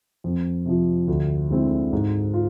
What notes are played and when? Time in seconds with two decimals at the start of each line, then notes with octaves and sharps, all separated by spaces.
0.24 F2
0.65 C3 F3
1.08 D2
1.50 D3 G#3 C4 E4
1.93 G#2
2.34 F4